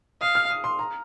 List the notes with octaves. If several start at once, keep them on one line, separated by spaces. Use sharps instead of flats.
F5 D#6
F6
D#6
C6
A#5